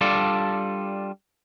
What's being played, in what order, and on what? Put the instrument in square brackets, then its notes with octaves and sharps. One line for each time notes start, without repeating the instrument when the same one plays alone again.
[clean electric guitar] G3 D4 F4 A4 D5